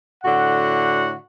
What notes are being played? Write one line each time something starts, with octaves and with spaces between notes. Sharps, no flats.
A2 D3 F#4 F#5